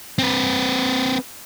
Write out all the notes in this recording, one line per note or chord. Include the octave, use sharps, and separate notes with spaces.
C4 B4